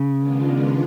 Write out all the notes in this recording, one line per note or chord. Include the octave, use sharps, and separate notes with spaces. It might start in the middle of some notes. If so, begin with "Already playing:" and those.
Already playing: C#3
D#3 G#3 B3 D4 F4